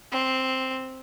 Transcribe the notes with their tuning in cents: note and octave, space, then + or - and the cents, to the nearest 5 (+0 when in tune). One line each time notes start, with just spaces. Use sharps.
C4 +0